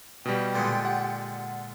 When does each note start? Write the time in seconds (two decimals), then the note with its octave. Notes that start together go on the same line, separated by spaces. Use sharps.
0.25 B2 G3 G4
0.55 A#2 D3 G#3
0.85 F#5